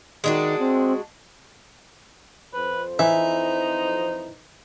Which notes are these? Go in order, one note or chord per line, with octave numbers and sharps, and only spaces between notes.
D#3 G#3 D4 F#4
C4
F2 B4 C5
E3 D#4 E5